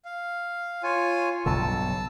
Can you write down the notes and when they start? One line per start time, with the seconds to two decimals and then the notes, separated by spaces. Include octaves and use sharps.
0.05 F5
0.83 F4 C#5 G#5
1.46 B1 G2 C#3 A5 E6